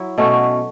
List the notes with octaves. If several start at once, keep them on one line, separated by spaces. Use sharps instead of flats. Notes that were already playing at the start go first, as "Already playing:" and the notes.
Already playing: F#3 E4
B2 A3 C#4 F#4